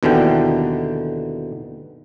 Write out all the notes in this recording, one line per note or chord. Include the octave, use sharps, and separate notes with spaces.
D#2 B2 D3 E3 G5